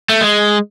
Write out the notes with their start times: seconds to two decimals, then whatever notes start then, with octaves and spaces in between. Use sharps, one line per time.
0.09 A3
0.21 G#3